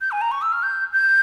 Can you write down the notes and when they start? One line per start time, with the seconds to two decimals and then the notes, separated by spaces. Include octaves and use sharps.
0.01 G6
0.11 G#5
0.21 A#5
0.31 C#6
0.42 E6
0.52 F6
0.63 G6
0.93 G6